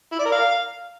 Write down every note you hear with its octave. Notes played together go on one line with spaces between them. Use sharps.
E4
D5
A#4
F5